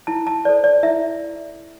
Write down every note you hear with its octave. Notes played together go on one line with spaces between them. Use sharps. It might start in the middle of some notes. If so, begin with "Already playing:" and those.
E4 A5
A5
A4 C5 D5
D5
E4 E5